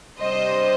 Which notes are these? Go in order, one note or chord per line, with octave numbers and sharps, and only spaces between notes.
C3 G3 D4 C5 D#5